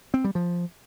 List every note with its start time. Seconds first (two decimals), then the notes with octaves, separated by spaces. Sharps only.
0.14 C4
0.24 G3
0.35 F3